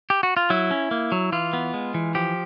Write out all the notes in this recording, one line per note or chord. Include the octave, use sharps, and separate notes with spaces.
G4
F#4
F4
F#3 E4
C#4
A#3
F#3
E3 F4
B3
G#3
E3
F3 G4